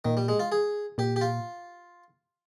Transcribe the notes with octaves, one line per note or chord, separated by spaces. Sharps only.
A#2 D#3
G3
G#3
F4
G#4
A#2 G4
G4
F4